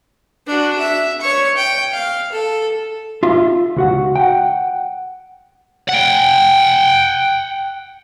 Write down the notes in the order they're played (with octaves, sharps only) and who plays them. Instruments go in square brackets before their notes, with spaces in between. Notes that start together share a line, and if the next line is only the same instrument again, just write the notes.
[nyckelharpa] D4 F#4
E5
C#5 C#6
G5
F5
A4
[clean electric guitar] F4 E5 C6
C#2 F#4 F#5
F#5 G5
[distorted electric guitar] F#5 G5